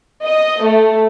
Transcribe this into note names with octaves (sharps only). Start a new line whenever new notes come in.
D#5
A3